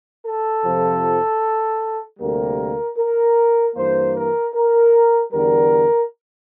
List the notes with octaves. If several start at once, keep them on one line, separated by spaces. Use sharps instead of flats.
A4
F2 C3 F3
D2 C3 G3 A#3 A#4
A#4
G2 E3 A#3 C5
A#4
A#4
E2 D3 G3 A#4